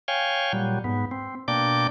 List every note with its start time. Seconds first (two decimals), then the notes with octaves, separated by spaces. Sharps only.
0.08 C#5 F5 G5 G#5
0.53 A#2 F#3 G3
0.84 G#2 B3
1.11 C4
1.48 B2 A#3 D4 D5 G5 D6